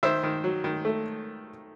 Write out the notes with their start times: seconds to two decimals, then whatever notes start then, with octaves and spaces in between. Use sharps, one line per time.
0.03 D#3 C5 E5
0.23 D#3
0.44 F#3
0.64 D#3
0.85 A3